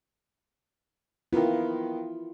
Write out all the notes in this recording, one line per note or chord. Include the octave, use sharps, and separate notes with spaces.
D#3 A#3 B3 E4 F4